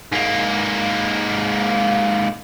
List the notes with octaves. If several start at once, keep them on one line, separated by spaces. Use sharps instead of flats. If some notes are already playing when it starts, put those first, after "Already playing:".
G#2 A#3